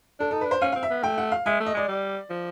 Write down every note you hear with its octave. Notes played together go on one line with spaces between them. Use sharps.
D4 A4
D#4 A4
D4 B4
C5
C#4 F5
C4 F5
E5
B3
A3 G5
F#5
F5
G#3 E5
A3
D#5
G#3 D5
G3
F3